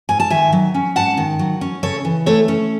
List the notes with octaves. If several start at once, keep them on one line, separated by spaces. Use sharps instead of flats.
G#2 G#5
A5
D#3 E5 G#5
F#3
C#4
G#2 F#5 A5
D#3
F#3
C#4
C#3 A4 C#5
E3
A3 A4 C#5
C#4